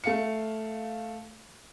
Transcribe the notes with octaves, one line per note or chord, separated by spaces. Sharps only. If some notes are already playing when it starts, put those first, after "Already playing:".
A3 F5 C#7